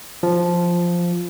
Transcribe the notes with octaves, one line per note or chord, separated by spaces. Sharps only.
F3